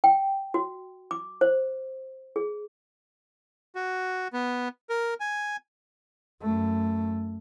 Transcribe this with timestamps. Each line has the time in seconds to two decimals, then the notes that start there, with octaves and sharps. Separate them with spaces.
0.04 G5
0.54 F#4
1.11 D6
1.41 C5
2.36 G#4
3.75 F#4
4.33 B3
4.90 A#4
5.20 G#5
6.42 F#2 A3